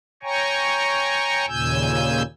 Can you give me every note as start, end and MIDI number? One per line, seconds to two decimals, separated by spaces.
0.23 1.46 73
0.23 1.46 79
0.23 1.46 80
0.23 1.46 82
0.23 1.46 85
1.48 2.22 39
1.48 2.22 46
1.48 2.22 49
1.48 2.22 80
1.48 2.22 88
1.48 2.22 91